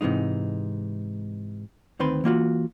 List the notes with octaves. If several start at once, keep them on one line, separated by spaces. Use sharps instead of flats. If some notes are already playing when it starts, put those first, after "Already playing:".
G#2 C3 E3 G#3 D#4
D2 D#3 C4 B4 C6
E3 A#3 F4 F#4